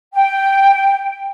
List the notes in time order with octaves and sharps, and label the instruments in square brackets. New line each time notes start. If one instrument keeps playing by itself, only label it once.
[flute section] G5